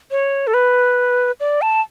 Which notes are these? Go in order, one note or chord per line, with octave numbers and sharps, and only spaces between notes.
C#5
A4
B4
D5
A5